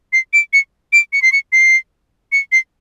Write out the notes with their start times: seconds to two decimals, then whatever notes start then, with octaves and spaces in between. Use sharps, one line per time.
0.13 C7
0.33 D7
0.53 C#7
0.93 D7
1.13 C#7
1.22 C7
1.32 C#7
1.52 C7
2.32 C#7
2.52 C7